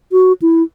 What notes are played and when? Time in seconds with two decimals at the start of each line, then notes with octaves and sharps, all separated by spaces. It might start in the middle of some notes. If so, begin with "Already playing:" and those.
0.12 F#4
0.42 E4